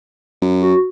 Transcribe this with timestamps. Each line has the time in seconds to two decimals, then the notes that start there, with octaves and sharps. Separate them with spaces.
0.42 F#2
0.62 F#4